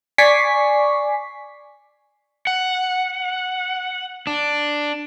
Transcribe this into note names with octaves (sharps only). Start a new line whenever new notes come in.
D5 G#5 C#6 D6 B6 C7
F#5
D4